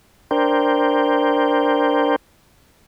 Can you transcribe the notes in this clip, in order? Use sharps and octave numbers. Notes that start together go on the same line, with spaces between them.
D4 A#4 C5 G5